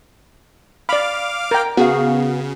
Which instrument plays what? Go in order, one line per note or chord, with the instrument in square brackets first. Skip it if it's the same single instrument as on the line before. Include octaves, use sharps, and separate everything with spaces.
[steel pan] D5 B5 [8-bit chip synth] F5 D6 F6
[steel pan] A#4 G5
[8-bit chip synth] C#3 [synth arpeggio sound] B3 [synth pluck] F#4 G#4 F5